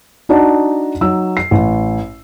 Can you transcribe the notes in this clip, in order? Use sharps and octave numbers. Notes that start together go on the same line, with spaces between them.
D4 D#4 F#4 D5 F#5 A5
F#3 D#4 E6
C7
A1